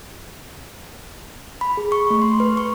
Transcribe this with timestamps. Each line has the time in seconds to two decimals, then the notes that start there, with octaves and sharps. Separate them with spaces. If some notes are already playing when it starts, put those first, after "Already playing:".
1.61 B5
1.77 G#4
1.92 C#6
2.10 A3
2.22 C6
2.40 B4
2.57 C#6